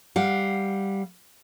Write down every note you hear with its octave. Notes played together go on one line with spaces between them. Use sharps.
G3 F5 F#5